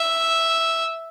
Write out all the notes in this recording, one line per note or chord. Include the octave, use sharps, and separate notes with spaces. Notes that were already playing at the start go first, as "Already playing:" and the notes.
Already playing: E5